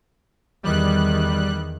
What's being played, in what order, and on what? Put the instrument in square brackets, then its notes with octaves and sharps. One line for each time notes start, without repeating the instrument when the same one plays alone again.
[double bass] E2 D#3 [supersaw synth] G3 F#6